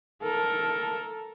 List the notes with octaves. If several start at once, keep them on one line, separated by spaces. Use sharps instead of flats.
A4 A#4